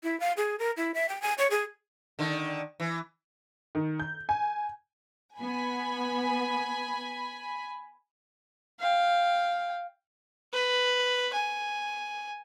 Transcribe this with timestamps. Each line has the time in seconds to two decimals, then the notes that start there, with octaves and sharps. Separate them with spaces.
0.03 E4
0.20 F5
0.37 G#4
0.59 A#4
0.77 E4
0.94 E5
1.09 G5
1.22 G#5
1.38 C#5
1.50 G#4
2.19 D3 D#3
2.80 E3
3.75 D#3
4.00 G6
4.29 G#5
5.40 B3 G#5 B5
8.80 F5 G5
10.53 B4
11.33 G#5